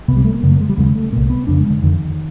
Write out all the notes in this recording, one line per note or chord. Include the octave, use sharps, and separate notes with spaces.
C2 C3 B3
G3
A3
A#3
F#2 C#3
A#3
G#3
G3
D#2 C#3 G#3
A3
C2 A#2 A#3
B3
F2 C#3 D4
G#3
D3
F2 D3 D#3